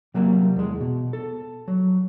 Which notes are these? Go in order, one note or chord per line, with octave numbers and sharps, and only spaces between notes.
C3 F#3 G3 A#3
E2 G#3
B2
A4
F#3